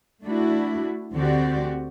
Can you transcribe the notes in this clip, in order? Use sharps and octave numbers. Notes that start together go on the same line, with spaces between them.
A3 D4 E4 F#4
D2 D3 C4 F#4 G4 D5